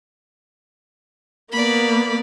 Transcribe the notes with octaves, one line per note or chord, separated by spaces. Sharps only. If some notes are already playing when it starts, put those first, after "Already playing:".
A#3 B3 D5 B5